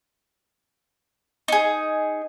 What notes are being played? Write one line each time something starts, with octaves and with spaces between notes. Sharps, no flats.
D#4 G#4